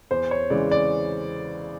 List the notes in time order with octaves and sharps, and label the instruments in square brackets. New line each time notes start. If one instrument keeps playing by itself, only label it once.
[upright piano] E2 C5
C#5
C#3 E3 G#3 D5
D5